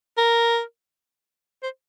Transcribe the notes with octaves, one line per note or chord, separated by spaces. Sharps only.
A#4
C5